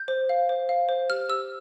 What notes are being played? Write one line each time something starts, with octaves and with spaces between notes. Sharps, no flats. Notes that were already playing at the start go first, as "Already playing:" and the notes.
Already playing: G6
C5
F5
C5
F5
C5
G4 F6
G4 E6